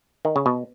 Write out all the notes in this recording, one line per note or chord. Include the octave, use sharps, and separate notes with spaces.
D#3
C#3
B2